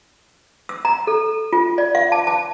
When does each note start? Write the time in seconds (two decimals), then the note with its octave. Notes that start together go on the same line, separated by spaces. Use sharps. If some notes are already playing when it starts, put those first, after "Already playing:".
0.69 E6
0.85 A#5
1.07 A4
1.53 F4
1.78 D5
1.95 F5
2.12 A5
2.27 A5